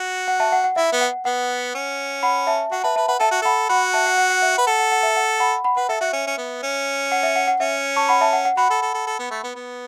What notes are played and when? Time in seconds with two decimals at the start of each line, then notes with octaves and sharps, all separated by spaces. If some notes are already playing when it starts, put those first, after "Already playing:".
Already playing: F#4
0.28 F#5
0.40 E5 A5
0.52 F#5
0.64 F#5
0.76 E4 E5
0.92 B3
1.01 F#5
1.25 B3 F#5
1.75 C#4
2.23 F#5 B5
2.47 E5 A5
2.72 F#4 F#5
2.83 B4 E5 A5
2.96 B4 E5 A5
3.08 B4 F#5
3.19 A4 E5 A5
3.31 F#4
3.42 A4 F#5 B5
3.69 F#4 F#5 B5
3.94 E5 A5
4.06 F#5
4.18 F#5
4.30 F#5
4.42 E5
4.55 B4 F#5
4.67 A4 F#5
4.79 F#5
4.92 F#5
5.03 E5
5.16 F#5
5.40 F#5 B5
5.64 F#5 B5
5.77 B4 F#5
5.89 A4 E5
6.01 F#4 E5
6.13 C#4
6.27 C#4
6.37 B3
6.63 C#4
7.12 F#5
7.23 E5
7.36 F#5
7.48 F#5
7.60 C#4 E5
7.96 A5 C#6
8.08 F#5 B5
8.21 E5 A5
8.33 F#5
8.45 F#5
8.57 F#4 F#5 B5
8.70 A4
8.82 A4
8.94 A4
9.07 A4
9.19 B3
9.30 A3
9.44 B3
9.55 B3